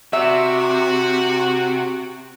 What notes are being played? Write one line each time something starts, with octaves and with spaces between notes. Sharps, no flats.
C3 F#4 E5